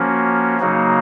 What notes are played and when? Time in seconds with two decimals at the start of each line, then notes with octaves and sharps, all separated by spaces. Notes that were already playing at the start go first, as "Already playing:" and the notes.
Already playing: F3 A#3 C#4 F#4
0.59 C#3 F#3 A#3 D#4 F#4